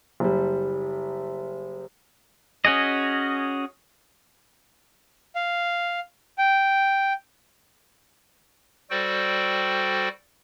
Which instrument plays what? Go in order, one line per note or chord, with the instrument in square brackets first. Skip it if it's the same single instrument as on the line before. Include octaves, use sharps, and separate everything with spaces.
[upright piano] F#1 G3
[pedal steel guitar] C#4 F#4 G#4 D#5
[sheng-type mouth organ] F5
G5
[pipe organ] G3 F#4 A4 C5 D5 G5